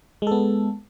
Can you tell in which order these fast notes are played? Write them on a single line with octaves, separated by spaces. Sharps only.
G#3 A4 B3